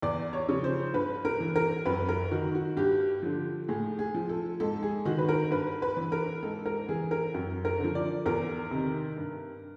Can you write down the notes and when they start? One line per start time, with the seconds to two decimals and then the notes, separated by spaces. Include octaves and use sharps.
0.02 E2 D5
0.33 C#5
0.49 C#3 F3
0.64 C5
0.94 G2 B4
1.25 A#4
1.40 E3
1.56 A#4
1.85 F#2 B4
2.09 A#4
2.31 D#3 F#4
2.55 F#4
2.77 G2 G4
3.23 D3 F3
3.68 A2 G#4
3.99 G#4
4.14 F3
4.29 A4
4.60 G#2 A4
4.83 G#4
5.05 D#3 F#4
5.18 B4
5.29 A#4
5.51 G2 B4
5.82 B4
5.97 E3
6.12 A#4
6.43 G#2 A4
6.66 A#4
6.89 E3 G#4
7.11 A#4
7.34 F#2
7.65 A#4
7.80 D3 F3
7.95 D5
8.26 E2 A#4
8.71 C3 D#3
9.17 G2